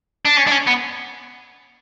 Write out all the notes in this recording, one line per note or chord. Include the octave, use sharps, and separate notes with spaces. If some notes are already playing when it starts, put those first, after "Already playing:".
D4
C#4
D4
C#4
B3